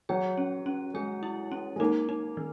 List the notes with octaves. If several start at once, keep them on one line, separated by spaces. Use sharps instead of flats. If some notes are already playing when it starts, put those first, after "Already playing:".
F#3 G#4
C#4
C#4
G#3 G#4
E4
C#4
G#3
A#3 D#4
D#4
D#3